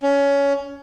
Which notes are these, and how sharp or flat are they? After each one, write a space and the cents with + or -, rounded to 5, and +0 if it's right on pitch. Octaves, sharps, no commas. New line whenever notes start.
C#4 +20